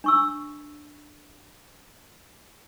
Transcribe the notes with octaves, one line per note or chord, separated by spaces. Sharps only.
D4 C#6 E6